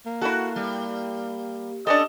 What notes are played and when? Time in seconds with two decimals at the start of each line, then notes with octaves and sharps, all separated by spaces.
0.06 A#3
0.21 E4 F#4 A4
0.56 G3
1.87 D3 C#4 D4 A4 D#5